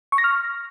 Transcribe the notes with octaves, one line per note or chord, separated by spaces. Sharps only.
C#6
A#6
F6